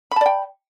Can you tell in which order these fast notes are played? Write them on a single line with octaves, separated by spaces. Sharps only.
B5 A5 D5 G5